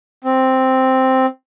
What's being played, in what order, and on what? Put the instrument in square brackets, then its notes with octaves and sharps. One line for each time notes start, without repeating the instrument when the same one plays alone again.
[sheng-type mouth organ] C4